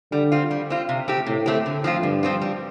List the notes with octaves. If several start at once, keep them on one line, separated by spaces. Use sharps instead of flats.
D3 G3
C4 F4
G3
C4 F4
C3
A3 C4 G4
A2 C3
A3 C4 G4
D3
F3 C4 F4
G2 D3
F3 C4 F4
G3